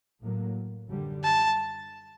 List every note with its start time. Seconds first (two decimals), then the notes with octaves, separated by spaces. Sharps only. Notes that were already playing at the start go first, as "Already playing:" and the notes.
0.21 A2 F#3 A#3
0.89 F#2 D3 G3
1.24 A5